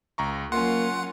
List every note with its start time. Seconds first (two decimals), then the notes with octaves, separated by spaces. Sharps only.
0.18 C#2 A#5 C#6
0.52 F#3 A#3 C#4 F4 F#5 C6